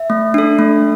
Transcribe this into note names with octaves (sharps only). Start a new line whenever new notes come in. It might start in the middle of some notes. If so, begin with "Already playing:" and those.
Already playing: E5
A3
D4 A4
A3